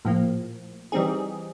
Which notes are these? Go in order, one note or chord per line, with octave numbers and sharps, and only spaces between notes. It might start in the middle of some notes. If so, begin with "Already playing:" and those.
A#1 A2 F3 A#3
E3 G3 C4 D#4 G#4